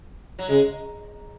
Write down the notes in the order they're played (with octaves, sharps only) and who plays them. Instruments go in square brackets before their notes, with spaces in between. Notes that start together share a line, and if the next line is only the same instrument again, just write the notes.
[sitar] F#3
[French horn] C#3 [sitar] G#3